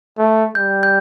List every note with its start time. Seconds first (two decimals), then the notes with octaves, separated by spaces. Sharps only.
0.18 A3
0.55 G3 G6
0.83 G6